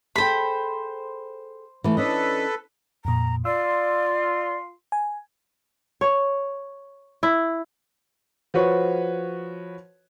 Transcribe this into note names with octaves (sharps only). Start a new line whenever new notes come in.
G#4 A4 C5 G5 B5
E3 F3 A3
C#4 D4 A4 B4 D#5
F2 A#2 A#5
F4 D5 C6 E6
G#5
C#5
E4
F3 F#4 B4 C#5